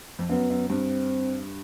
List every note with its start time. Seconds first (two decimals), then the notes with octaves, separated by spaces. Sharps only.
0.19 F2
0.29 F#2 B3
0.50 F#2
0.70 G2 C4